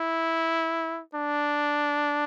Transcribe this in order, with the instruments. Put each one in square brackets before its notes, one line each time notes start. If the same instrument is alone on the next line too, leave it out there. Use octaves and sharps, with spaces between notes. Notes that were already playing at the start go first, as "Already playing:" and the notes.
Already playing: [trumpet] E4
D4